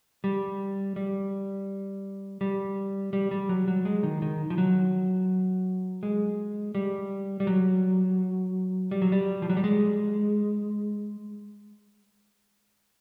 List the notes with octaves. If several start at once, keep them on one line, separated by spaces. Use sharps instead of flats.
G3
G3
G3
G3
G3
F#3
F#3
G#3
D#3
D#3
F3
F#3
G#3
G3
G3
F#3
G3
F#3
G3
F3
F#3
G3
G#3